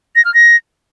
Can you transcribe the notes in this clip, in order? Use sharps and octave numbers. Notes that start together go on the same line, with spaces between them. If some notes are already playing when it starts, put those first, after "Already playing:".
A#6
F6
A#6